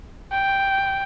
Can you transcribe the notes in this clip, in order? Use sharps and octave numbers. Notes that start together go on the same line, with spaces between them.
G5